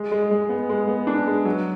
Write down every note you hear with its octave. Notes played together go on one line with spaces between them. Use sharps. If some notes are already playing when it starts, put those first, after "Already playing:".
Already playing: G#3
G#3
G#3
B3
G#3
B3
D4
G#3
F#3